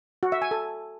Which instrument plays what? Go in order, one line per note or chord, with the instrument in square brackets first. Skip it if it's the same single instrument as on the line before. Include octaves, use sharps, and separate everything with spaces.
[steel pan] F#4
E5
G#5
A4